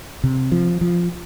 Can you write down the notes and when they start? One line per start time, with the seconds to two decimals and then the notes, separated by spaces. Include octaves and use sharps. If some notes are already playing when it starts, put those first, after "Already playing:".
0.24 C3
0.52 F3
0.81 F3